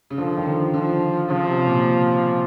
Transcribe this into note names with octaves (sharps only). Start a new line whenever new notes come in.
C#3
D3 F3
D#3
D3
D3 F3
C#3 F3
C3
A#2